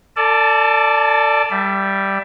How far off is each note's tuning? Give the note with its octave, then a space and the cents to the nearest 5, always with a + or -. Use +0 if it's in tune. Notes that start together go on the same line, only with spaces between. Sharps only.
A4 +30 D5 +0 A5 -30
G3 +0 E5 +15